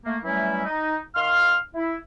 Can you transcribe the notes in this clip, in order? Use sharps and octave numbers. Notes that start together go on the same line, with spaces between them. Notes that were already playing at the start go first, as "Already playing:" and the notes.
A3 A#3
E3 F#3 G3 A3 C#4 E4
D#4
D#3 F5 C6 F6
E4